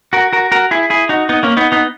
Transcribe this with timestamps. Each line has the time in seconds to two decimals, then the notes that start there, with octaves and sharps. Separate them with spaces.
0.13 F#4 A#4
0.33 F#4 A#4
0.52 F#4 A#4
0.71 E4 G#4
0.90 E4 G#4
1.09 D#4 F#4
1.29 B3 D#4
1.43 A#3 C#4
1.57 B3 D#4
1.72 B3 D#4